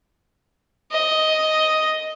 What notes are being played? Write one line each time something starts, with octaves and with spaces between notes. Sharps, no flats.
D#5